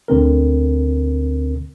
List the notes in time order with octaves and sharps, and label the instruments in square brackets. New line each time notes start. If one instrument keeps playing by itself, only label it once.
[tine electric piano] D2 D3 C4 A#4